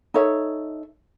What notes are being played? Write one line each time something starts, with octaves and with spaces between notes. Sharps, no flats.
D#4 A4 C#5 E5